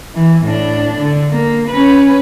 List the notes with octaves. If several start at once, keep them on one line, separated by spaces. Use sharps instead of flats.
E3
A2 D4
D3
A#3
C#4 B4